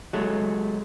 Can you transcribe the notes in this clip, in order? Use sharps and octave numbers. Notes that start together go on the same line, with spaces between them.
F#3 G#3 A3